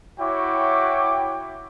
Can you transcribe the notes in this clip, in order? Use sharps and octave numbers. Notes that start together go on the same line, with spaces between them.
E4 F#4 C#5 G5 D6